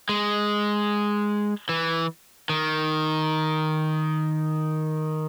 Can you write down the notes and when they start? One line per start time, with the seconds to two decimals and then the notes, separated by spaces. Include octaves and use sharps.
0.09 G#3
1.69 E3
2.49 D#3